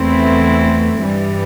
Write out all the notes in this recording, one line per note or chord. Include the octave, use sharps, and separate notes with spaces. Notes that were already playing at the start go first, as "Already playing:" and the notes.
Already playing: E2 E3 A3 C4 E4
G2 E3 G3